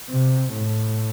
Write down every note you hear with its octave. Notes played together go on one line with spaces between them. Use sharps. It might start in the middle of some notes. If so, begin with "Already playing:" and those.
C3
A2